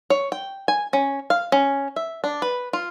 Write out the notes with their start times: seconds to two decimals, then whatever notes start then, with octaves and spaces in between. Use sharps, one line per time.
0.10 C#5
0.32 G5
0.68 G#5
0.93 C#4
1.30 F5
1.52 C#4
1.96 E5
2.24 D4
2.42 B4
2.73 F4